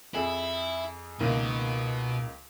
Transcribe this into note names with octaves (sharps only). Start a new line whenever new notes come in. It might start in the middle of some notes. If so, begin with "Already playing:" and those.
F2 E4 G#4 A4
C#2 B2 D#3 A#3